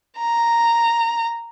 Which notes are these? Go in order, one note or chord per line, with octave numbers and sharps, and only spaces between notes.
A#5